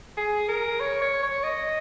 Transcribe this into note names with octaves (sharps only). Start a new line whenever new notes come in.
G#4
A#4
C#5
C#5
C#5
D#5